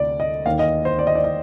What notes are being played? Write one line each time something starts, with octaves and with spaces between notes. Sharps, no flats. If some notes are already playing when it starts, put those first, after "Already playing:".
Already playing: D2 C3 D5
D#5
D#2 D#3 F5
D#5
C5
D5
D#5
D5
D#5